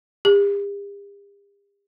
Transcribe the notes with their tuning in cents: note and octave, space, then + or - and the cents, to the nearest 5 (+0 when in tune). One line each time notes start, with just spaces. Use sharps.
G4 +45